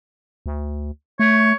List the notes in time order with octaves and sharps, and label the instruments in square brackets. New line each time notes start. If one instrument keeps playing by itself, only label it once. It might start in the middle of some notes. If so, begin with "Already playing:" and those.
[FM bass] D2
[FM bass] A3 [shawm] C#5